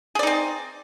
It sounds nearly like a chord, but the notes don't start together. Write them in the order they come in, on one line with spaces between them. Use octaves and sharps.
G#4 D5 D#4 C4